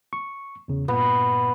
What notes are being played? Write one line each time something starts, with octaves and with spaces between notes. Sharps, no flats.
C#6
E2 C#3
G2 A#2 B3